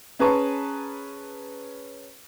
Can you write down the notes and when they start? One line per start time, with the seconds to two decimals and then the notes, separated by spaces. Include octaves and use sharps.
0.19 C#4 G#4 B4 A5 A#5 C#6